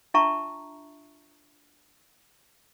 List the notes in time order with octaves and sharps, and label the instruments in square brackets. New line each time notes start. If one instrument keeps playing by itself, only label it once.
[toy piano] D4 F4 E5 A5 A#5 C#6